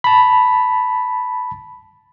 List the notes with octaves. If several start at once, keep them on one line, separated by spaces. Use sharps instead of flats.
A5 B5